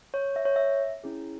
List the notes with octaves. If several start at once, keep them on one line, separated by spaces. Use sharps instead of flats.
C#5
E5
C#5
E5
C#4 E4 G#4